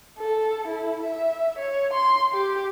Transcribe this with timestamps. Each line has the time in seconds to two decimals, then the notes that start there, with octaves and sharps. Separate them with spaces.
0.19 A4
0.67 E4
1.03 E5
1.58 C#5
1.93 C6
2.33 G4